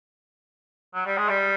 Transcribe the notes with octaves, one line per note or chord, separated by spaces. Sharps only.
F#3
G3
G#3
G3